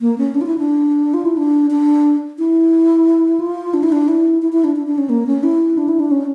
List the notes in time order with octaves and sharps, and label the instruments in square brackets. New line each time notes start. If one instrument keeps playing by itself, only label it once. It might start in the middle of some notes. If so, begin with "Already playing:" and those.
[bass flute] A#3
C#4
D4
F4
E4
D4
F4
E4
D4
D4
E4
F4
D4
E4
D4
E4
E4
E4
D4
D4
D4
C#4
A#3
C#4
E4
D4
E4
D4
C#4